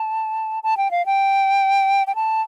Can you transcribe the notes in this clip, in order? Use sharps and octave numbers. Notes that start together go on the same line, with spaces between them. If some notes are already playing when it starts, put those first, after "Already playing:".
Already playing: A5
A5
G5
F5
G5
G5
A5